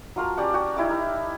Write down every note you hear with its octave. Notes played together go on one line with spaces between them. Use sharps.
F#3 F4 A#4 A5
C#4 G4 D5 F#5
F#4 G4 F#5
D#4 E4 G4 D6
A#4